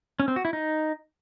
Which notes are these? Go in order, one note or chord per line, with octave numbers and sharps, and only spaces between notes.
C#4
C4
F#4
E4
D#4